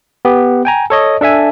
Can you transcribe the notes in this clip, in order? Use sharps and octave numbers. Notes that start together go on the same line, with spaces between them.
B3 G4
G5 G#5 A#5
A4 C#5 D#5
D4 A4 E5 G#5